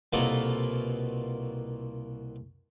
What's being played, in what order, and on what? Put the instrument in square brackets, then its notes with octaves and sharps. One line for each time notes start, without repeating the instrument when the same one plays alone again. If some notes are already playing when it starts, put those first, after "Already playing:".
[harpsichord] C2 B2 A#3 F4 A4 B5